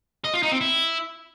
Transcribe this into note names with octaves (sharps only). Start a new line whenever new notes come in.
D#5
F4
D#4
C4
E4